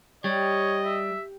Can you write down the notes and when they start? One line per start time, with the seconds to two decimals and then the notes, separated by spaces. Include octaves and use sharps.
0.24 G3 G4 C#5 D#5
0.85 E5